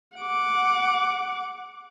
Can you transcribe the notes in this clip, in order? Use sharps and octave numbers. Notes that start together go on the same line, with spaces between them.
F#5 D6